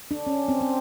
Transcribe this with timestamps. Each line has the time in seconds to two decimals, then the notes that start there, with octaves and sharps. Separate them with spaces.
0.11 D4
0.27 C#4
0.48 C4
0.61 C4